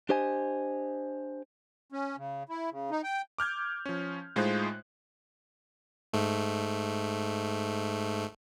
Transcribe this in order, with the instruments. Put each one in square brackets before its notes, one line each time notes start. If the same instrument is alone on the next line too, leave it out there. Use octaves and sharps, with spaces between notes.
[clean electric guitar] D4 G4 C5 D#5 G#5
[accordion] C#4
C#3
E4
C#3
D#4
G5
[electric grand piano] D6 F6 G6 G#6
F3 C#4
A2 G#3 D#4 F4 C5 F#6
[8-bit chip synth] G#2 A3